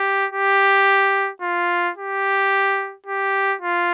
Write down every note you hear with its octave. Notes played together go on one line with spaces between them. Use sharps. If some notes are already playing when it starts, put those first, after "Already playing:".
Already playing: G4
G4
F4
G4
G4
F4